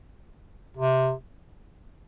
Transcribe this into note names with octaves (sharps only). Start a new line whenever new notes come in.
C3